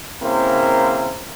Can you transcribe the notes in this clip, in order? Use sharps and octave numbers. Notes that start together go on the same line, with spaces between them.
C#3 A#3 C4 E4 A#4 C5